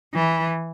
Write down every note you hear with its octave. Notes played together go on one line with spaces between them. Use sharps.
E3